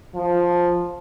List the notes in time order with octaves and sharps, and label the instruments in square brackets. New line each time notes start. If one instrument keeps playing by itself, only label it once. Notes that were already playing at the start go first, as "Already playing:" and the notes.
[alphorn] F3